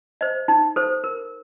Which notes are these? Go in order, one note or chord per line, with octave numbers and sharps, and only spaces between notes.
C5 D#5
D#4
A4 C5
A#4